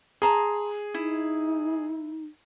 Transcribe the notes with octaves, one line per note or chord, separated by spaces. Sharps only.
G#4 A5 A#5 C6
D#4 E4